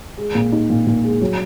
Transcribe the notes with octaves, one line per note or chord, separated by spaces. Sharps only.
G#3
A#2
D#4
A#2
A#2
G#3
F#3